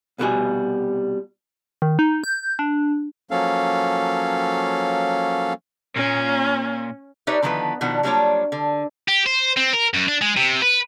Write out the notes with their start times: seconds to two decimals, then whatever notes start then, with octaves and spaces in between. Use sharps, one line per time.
0.18 C2 B2 D3 G3 F#4 G#5
1.82 D#3
1.99 D#4
2.24 G6
2.59 D4
3.31 F3 F#3 A#3 C#4 A4 F5
5.96 A#2 C#4
7.27 D#4 G4 B4 C#5 D5 E5
7.42 D3 D#3 F3 B3 E4 B4
7.81 B2 D#3 F3 D4 F#5
8.03 F#3 G3 A#3 D4 F4 C#5
8.52 D3
9.08 G4
9.26 C5
9.57 C4
9.73 A#4
9.94 F#2
10.08 D4
10.22 G#3
10.37 C3
10.62 B4